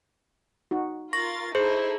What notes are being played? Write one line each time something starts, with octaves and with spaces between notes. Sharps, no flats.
D#4 F#4
F4 A#4 C#6 A6 A#6
D#4 E4 G#4 A4 C5